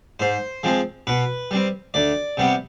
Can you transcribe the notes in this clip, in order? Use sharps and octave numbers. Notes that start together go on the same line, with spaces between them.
G#2 C5
F3 G#3 C4
B2 B4
G3 C4
D2 D5
C3 G3 B3